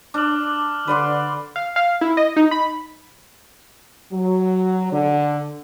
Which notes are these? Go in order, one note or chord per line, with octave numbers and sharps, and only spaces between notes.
D4 D6 F6 F#7
D3 B4 D5 C6
F5
F5
E4
D#5
D#4
B5
F#3
D3